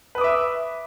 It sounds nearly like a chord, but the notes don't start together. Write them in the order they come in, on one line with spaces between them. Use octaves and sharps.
B4 D#6 D6 E5